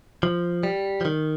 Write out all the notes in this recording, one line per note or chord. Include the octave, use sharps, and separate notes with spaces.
F3
G3
F3
D#3